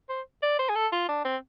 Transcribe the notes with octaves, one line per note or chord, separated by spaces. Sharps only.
C5
D5
C5
G#4
A4
F4
D4
C4